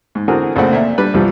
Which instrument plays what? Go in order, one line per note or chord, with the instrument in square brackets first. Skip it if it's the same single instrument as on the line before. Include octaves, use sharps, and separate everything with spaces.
[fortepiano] G#2
D3 E3 C4 F#4 G#4 A#4
A#1 C#3 A3 C4 F#5
A#2 E5
G3 D4 B4
C2 F3 G3